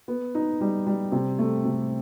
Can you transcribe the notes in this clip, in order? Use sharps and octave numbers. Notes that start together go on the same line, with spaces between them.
B3
D#4
G3
G3
C3
A3
C3